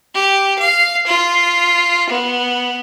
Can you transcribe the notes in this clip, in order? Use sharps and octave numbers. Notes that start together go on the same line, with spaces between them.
G4
F5
F4
B3